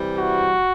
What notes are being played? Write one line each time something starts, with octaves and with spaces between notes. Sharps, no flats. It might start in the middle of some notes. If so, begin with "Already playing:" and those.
Already playing: C3 E3 G3
F#4